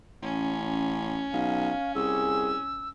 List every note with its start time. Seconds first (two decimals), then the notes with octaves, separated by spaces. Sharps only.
0.22 A1 C#4
1.34 B1 F5
1.95 C2 G#4 E6